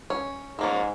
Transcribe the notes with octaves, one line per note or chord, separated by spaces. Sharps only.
C#4
G#2 F3 A#3 C#4